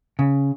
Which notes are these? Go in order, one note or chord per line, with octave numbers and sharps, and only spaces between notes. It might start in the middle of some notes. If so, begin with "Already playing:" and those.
C#3